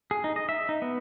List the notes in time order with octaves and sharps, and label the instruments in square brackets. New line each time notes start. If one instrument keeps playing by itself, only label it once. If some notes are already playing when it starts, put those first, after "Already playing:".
[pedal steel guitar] G#4
D#4
D#5
E5
D#4
B3